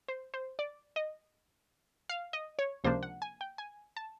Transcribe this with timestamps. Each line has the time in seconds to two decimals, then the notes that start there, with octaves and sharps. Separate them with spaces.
0.08 C5
0.34 C5
0.59 D5
0.96 D#5
2.09 F5
2.33 D#5
2.59 C#5
2.84 C#2 C3 F3 A#3 D4 C5
3.03 F#5
3.22 G#5
3.41 G5
3.58 G#5
3.97 A5